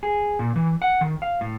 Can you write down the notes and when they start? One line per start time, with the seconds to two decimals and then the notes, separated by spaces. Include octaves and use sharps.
0.03 G#4
0.39 A#2
0.56 E3
0.82 F#5
1.01 D#3
1.22 F5
1.41 A2